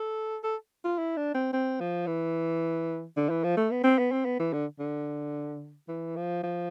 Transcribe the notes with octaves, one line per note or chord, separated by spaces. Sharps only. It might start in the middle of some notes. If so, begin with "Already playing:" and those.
Already playing: A4
A4
F4
E4
D4
C4
C4
F3
E3
D3
E3
F3
A3
B3
C4
B3
C4
B3
E3
D3
D3
E3
F3
F3